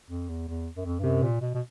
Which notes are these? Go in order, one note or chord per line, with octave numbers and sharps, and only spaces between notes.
F2
E2
E2
F#2
F2
G2
F#2 C3
A#2
B2
B2